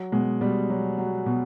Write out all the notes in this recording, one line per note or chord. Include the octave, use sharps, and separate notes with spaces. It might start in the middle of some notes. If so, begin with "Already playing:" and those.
Already playing: F#3
B2 G#3
B2 G3
F#3
F#3
B2